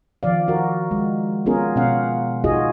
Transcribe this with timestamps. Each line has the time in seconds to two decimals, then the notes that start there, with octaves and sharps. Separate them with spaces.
0.23 D#3 F3 D5 F5
0.48 F#4 A#4
0.91 G#3
1.46 B3 C#4 F4 G#4 A#4
1.76 B2 C#4 F5 F#5
2.44 D#4 F4 F#4 G#4 D#5